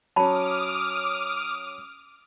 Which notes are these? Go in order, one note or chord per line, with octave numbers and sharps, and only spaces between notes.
F#3 C#4 A5 B5 D6 D#6 F6